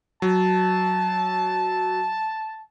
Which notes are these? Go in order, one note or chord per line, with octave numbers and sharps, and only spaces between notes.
F#3 A5